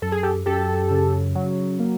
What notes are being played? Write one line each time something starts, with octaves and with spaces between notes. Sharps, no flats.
F#2 A4
G#4
G4 A4
F#2 G4 A4
C#3
F#3
A#3